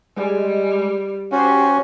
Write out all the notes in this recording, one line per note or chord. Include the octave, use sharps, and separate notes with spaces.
G3 G#3
C#4 F#4 G4 C5